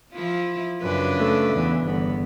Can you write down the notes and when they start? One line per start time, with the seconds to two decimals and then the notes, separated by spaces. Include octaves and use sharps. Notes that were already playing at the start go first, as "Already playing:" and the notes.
0.13 F3 E4 F4
0.82 F#2 C#3 D4 B4
1.17 A3
1.53 E2
1.84 G1 E2 B3